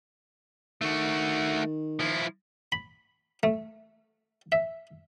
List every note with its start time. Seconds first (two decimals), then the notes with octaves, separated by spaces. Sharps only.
0.81 D#3 A3 F#4
2.00 F3 E4
2.72 B5
3.43 A3
4.52 E5